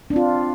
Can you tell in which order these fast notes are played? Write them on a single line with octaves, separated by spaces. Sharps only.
D4 C4 F4